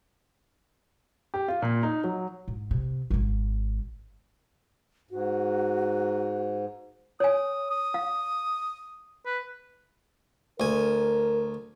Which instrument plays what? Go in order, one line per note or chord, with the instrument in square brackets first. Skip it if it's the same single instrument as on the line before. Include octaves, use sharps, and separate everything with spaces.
[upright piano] G4
F4
A#2
D#4
F#3
[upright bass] G#2
C3
G#1 G#2
[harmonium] G#2 [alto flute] F#4
[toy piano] C#5 G#5 [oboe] D#6
[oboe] D#6
[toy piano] F5
[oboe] B4
[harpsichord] D2 G#5 [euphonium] A#4